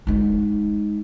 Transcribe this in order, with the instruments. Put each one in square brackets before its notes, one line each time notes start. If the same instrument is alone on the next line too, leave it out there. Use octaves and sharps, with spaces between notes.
[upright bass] G#3 D#4